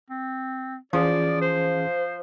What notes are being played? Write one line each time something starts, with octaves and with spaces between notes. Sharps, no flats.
C4
E3 F3 C#4 G#4 D5
C5